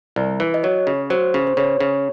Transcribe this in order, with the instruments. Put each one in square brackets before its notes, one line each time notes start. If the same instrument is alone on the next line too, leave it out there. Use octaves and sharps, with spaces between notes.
[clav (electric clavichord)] C2
E3
[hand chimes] D#5
[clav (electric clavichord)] F#3 [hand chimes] C#5
[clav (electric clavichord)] C#3
[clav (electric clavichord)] F#3 [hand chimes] C5
[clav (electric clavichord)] C#3
[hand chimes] C5
[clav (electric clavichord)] C#3 [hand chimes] C#5
[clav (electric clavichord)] C#3